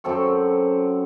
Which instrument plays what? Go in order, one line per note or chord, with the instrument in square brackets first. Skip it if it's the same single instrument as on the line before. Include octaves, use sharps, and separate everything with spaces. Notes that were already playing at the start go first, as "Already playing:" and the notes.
[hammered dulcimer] F#2 C4 A4 C#6